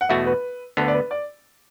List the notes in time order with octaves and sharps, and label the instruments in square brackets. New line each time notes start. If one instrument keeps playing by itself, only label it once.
[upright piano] F#5
[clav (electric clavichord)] E2 B2 A3 F#4 [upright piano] E5
[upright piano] B4
[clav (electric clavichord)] D2 D3 B3 [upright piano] A4
[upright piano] D5
B4
D5